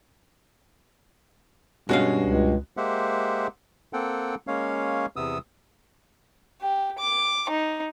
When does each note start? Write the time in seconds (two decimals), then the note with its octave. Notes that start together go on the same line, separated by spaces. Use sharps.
1.89 G2 B2 G#3 C#4 F#4 F5
2.24 C#2
2.77 G#3 A#3 G4 C5 E5 F#5
3.93 A#3 C4 A4 F#5 G5
4.47 G#3 A#3 C#4 C#5 F5
5.16 E2 C3 B3 D#6 E6
6.61 G4
6.99 D6
7.50 D#4